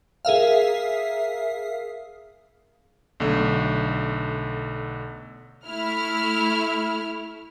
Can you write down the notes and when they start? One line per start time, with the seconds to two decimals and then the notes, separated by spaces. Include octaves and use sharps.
0.25 G#4 A#4 E5 F5
3.20 B1 D3 A3
5.66 A3 E4 F6